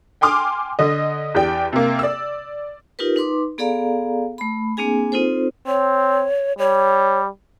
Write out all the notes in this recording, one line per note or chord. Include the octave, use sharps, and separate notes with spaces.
G5 G#5 C6 D6 F6
D3 D#5
E2 G4 D5 G5
C3 A#3
D5 E6
D#4 F4 G4 A#4 B4
D#4 B4 C6 D6
B3 G#4 A4 D5 F5 A#5
A3 B5
A#3 C4 D4 G#4 G#5
C4 D#4 F4 A4 C5
C4 C#5
G3 C#5